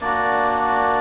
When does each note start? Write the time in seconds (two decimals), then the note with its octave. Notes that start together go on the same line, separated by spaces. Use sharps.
0.01 A#3 D4 F#4 D5